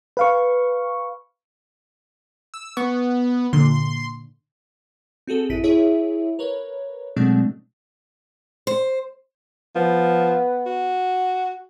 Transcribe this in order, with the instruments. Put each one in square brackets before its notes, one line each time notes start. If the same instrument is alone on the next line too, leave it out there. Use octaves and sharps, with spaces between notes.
[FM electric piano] B4 F5 C#6
[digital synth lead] E6
[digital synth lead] B3 [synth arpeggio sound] C#6
[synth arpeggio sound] A#2 D3 [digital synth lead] C6
[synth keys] C4 F#4 G#4 A4
A1 F#2 E4 B6 D#7
E4 G#4 C#5 E5
A#4 B4 C#5
B2 F#3 G#3 A3 C4 D4
[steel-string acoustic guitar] C5
[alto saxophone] F3 [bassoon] B3
[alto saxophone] F#4